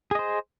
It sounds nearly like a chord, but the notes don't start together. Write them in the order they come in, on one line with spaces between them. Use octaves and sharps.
G#4 D#5 C5